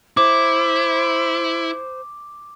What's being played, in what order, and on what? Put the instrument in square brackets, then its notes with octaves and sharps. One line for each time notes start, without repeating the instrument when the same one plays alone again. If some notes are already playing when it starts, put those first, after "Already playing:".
[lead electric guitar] E4 [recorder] C5 [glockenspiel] D6